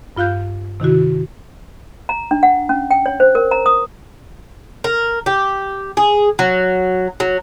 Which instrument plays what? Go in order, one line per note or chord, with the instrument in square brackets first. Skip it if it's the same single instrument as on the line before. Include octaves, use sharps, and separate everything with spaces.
[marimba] G2 F4 F5 F#6 G6
C3 D#3 E4 F#4
[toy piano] A#5
D4
F#5
C#4
G5
C#5
C5
A#4
A#5
D#6
[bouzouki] A#4
G4
G#4
F#3
F#3